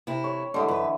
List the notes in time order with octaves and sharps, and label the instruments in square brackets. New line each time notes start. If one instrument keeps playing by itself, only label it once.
[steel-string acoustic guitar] C3 E4
[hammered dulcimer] C#5
[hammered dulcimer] D3 E3 [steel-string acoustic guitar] G3 G#3
[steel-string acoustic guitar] F#2 B4